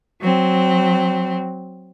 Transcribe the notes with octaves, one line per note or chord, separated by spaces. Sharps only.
F#3 C4